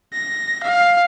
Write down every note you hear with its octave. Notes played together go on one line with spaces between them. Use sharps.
A#6
F5